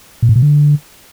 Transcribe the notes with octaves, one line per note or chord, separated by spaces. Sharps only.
A#2
A2
B2
D3